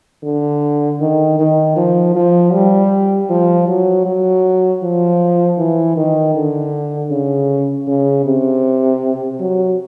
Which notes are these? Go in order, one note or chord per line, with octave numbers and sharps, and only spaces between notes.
D3
D#3
D#3
F3
F3
G3
F3
F#3
F#3
F3
E3
D#3
D3
C#3
C#3
C3
F#3